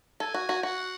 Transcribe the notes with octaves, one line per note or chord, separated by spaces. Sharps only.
A4 G#5
F#4
F#4
F#4 F#5